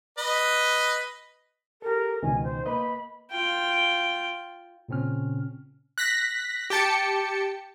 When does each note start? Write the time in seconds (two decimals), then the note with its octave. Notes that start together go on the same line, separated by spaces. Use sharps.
0.18 B4 D#5
1.82 G4 A4 A#4
2.23 C#2 B2 D#3 G#5
2.43 C5
2.66 A#3 B4 D#5 B5
3.31 F4 G5
4.89 A#2 C#3 C4 C#4 F6
5.98 F#6 A#6 B6
6.70 G4 G5 A5 C#7